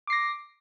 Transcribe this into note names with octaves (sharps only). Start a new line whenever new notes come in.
D6 A#6 C7